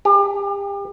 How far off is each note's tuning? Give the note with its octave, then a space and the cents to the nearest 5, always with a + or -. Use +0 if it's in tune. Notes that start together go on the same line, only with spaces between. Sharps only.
G4 +35